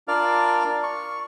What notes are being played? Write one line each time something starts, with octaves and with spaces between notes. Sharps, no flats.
D4 F4 A#4 D5 F5 F6
C#6